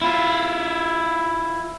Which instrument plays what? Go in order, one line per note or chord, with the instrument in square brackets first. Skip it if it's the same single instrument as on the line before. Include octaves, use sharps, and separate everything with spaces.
[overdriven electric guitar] E4 F4